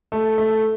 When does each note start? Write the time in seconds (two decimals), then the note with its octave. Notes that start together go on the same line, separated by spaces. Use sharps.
0.12 A3
0.38 A3